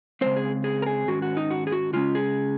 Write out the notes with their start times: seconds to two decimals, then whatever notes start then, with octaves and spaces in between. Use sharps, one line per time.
0.21 C#3 G#3 C4 C5
0.36 G#4
0.64 G#4
0.82 A#4
0.86 G#4
1.07 G#2 D#3 G#3 C#4 F#4
1.22 F#4
1.37 D#4
1.51 F#4
1.67 G#4
1.72 F#4
1.93 C#3 G#3 C#4 F4
2.15 G#4